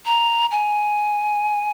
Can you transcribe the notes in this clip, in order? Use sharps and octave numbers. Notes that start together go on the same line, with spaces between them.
A#5
G#5